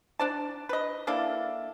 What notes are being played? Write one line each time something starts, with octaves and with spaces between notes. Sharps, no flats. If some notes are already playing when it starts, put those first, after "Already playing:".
D4 D5 A5
B4 D#5
A#3 D4 E4 A4